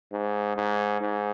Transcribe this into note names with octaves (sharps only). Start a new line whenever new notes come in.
G#2
G#2
G#2